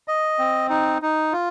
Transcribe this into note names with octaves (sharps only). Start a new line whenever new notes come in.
D#5
C4
D#4
D#4
F4